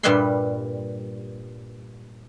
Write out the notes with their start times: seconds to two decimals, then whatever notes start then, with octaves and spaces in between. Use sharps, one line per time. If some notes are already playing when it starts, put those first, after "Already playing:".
0.03 G2 A#2 G3 B4 E5 C6